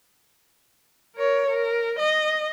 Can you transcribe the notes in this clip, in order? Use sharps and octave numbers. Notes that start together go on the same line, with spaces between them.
A#4 C#5
A#4
D#5